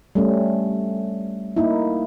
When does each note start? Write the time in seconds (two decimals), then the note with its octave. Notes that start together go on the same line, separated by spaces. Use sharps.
0.15 G3 A3 C#4
1.56 A#3 D#4 E4